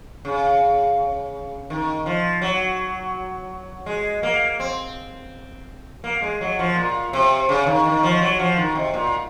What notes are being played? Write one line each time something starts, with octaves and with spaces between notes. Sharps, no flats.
C#3
D#3
F3
F#3
G#3
A#3
C4
A#3
G#3
F#3
F3
A#2
C3
C#3
D#3
D#3
F3
F#3
F3
D#3
C3
A#2